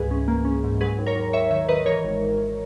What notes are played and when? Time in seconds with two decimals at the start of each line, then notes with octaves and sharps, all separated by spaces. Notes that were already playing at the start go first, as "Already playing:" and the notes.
Already playing: C#2 G#2 E3 G#4 B4
0.11 C#4
0.28 A#3
0.45 C#4
0.64 G#2
0.81 F#3 G#4 B4
0.98 D#2
1.06 A#4 C#5
1.16 D#2
1.33 D#2 C#5 E5
1.51 D#3 C#5 E5
1.69 D#3 B4 D#5
1.86 E3 A#4 C#5
2.04 G#1
2.21 G#1
2.39 G#1